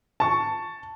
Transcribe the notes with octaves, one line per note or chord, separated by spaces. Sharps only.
A5 C#6